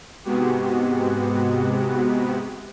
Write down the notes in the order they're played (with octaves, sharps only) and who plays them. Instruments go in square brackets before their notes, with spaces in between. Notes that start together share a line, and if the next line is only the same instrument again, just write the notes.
[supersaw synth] G#2 C3 G#3 B3 F#4 G4